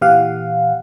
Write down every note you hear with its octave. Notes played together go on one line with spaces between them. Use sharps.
A#2 E3 G4 F5 F#5